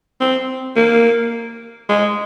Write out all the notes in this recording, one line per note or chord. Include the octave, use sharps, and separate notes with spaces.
C4
A#3
G#3